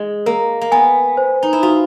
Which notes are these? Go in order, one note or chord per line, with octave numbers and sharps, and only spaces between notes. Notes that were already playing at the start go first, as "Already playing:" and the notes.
Already playing: G#3 D#5
A#3 A#4
A#3
B3 G#5
C5
D#4
E4
F4 F#4